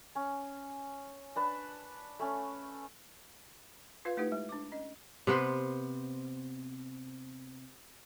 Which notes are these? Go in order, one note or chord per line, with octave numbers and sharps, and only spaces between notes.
C#4
D4 B4 A5
A3 C#4
F4 B4 F5
A3 D#4 E4 G4 B4
G#3
D4 D6
C#4 D#5
C3 B3 B4 C5